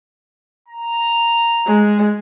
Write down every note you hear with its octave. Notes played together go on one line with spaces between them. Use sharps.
A#5
G#3